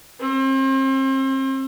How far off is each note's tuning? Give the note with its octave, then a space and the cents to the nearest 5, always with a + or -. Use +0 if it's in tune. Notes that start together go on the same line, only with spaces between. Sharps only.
C4 +35